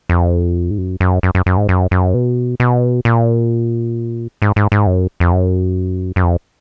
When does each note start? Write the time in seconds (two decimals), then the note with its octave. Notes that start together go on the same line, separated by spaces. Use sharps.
0.09 F2
0.71 G#2
0.78 F#2
1.00 F#2
1.23 F#2
1.35 F#2
1.46 F#2
1.57 G#2
1.69 F#2
1.91 F#2
2.14 B2
2.60 B2
3.05 A#2
4.42 G#2
4.56 G#2
4.72 G#2
4.87 F#2
5.20 F2
5.32 F#2
6.16 F#2
6.23 F2